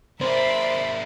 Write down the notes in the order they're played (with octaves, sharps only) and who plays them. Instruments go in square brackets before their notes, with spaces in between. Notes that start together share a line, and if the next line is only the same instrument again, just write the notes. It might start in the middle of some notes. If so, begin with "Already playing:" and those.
[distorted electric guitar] A#3 G#4 [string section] A#4 D5 C6 [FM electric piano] C5 [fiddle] E5 B5